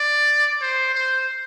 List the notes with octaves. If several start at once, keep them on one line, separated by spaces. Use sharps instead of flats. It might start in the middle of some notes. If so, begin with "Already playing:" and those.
Already playing: D5
C5
C5